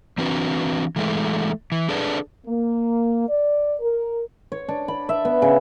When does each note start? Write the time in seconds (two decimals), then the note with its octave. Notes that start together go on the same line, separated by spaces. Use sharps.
0.18 E3 C4 D4 F#4 B4
0.96 E3 G#3 A3
1.72 E3
1.89 D4 G#4 A4 B4 D5
2.46 A#3
3.28 D5
3.80 A#4
4.52 C#5
4.69 D4
4.88 B5
5.09 E5
5.25 B3
5.42 C#3